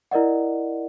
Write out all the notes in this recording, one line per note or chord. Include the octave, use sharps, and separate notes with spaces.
E4 A#4 D5 D#5 F#5